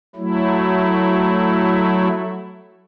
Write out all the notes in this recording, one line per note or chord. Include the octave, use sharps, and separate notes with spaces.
F#3 A3 E4